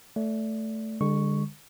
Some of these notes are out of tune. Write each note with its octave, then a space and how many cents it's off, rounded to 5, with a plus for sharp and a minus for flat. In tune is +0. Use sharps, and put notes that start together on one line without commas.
A3 +0 D5 -25
D3 +0 G#3 -45 C#6 +0